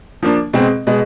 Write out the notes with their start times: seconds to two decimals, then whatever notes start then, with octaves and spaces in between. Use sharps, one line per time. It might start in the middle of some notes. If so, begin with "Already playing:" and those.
0.23 F3 A#3 D4
0.53 B2 G#3 C4
0.87 B2 G#3